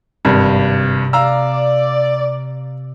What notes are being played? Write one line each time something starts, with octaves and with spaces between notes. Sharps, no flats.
G#1 G2 C3
D5 F5 A#5 E6